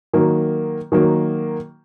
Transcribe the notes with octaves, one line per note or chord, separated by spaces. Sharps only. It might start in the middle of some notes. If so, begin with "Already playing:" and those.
D#3 F#3 A#3
D#3 F#3 A#3